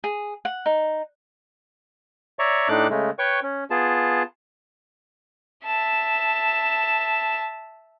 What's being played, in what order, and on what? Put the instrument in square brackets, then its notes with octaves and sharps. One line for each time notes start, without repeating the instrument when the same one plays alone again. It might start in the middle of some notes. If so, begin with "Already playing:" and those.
[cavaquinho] G#4
F#5
D#4
[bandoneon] C#5 D5 E5 A#5 C#6
A2 A3 D4 D#4 D6 F#6
C#3 G#3 A3
B4 C#5 G5 C#6
C#4
B3 F4 G#4 A5
[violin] E5 A5